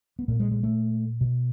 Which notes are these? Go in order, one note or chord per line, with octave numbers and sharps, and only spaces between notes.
B3
A#2 A#3
G#3
G#3
A3
B2